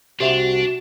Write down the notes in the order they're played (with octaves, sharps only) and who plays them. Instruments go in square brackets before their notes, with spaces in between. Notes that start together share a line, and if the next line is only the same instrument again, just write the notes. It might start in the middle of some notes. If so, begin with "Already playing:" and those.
[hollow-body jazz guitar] C2 C5 [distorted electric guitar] D4 [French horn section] F#4 [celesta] G4 E5 F7